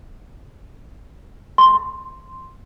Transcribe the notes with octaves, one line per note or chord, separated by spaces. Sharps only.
C6